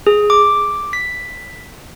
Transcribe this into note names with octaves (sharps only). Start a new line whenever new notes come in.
G#4
D6
B6